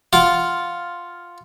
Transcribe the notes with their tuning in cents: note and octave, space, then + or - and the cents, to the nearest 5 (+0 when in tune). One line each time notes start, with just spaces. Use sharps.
F4 +0 F#5 +0 D6 -10